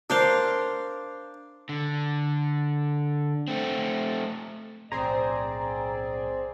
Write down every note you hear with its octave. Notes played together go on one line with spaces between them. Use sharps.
D4 A#4 C5 F5
D3
A3 C4
B1 A2 C4 G#4 D5 A#5